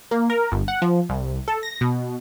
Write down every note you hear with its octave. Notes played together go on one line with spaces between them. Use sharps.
A#3
A#4
G1
F#5
F3
C2
A4
A#6
B2